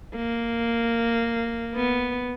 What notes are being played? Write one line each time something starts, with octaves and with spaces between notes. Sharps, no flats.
A#3
B3